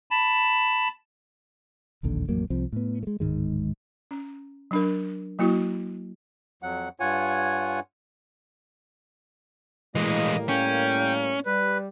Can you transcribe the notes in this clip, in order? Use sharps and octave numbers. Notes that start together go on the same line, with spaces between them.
A5 B5
E1 A#1 D#2 D3
A1 F2 F#3 A#3
C2 F3 C4
A2 B3
G#3 A3
D1 G#2 D#3 G#3
C#4
F#3 D4 A#4
F#3 A#3 E4 F#4
F2 F#3 F#5
G2 F4 C#5 F#5 G#5
A2 E3 G3 G#3 A#3 D#5
C#4 G5
G3 B4 D5